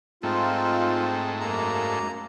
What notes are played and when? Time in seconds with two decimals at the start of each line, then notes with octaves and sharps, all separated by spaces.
0.23 G#2 A3 C4 D#4 F4
1.41 F#2 A#3 A#5